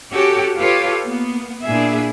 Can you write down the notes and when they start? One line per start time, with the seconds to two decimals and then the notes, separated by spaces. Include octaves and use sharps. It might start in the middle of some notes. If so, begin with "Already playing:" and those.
0.11 C#4 F#4 G4 A4 C#5
0.58 F4 G4 A4 B4 C#5
1.05 A#3 B3
1.65 A#2 D4 E4 G#4 E5